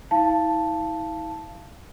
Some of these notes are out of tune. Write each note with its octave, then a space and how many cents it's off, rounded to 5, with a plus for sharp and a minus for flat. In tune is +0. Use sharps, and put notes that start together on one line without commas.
E4 -40 F5 -20 A5 +0